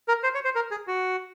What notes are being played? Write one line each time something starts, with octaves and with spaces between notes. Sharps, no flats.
A#4
C5
C#5
C5
A#4
G#4
F#4